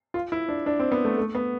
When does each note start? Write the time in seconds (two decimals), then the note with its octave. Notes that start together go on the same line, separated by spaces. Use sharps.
0.14 F4
0.32 E4
0.49 D4
0.66 D4
0.79 C4
0.92 B3
1.05 A3
1.18 A3
1.35 B3